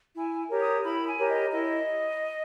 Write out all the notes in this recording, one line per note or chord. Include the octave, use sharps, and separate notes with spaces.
E4 G#5
G4 A#4 C#5
D#6
E4 B5
G#5
G4 A#4 C#5
D#5
E4 D#5